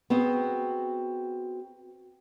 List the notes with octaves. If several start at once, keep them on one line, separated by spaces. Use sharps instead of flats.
B3 C4 F#4 G#4